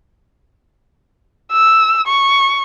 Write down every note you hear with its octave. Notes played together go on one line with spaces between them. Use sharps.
E6
C#6